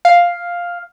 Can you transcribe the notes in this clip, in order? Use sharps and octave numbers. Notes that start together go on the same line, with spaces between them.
F5